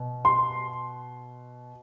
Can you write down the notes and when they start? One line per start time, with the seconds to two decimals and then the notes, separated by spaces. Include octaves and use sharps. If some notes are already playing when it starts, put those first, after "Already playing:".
Already playing: B2
0.25 C6